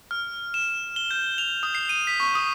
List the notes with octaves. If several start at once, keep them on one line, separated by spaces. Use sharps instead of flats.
F6
E7
G7
G6
F7
D#6
C7
D#7
B6
C#6
D#6